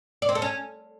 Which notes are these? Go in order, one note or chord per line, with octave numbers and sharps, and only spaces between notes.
D5
C4
A4
C#4